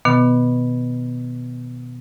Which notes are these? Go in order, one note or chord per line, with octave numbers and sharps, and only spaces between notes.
B2 D#3 B3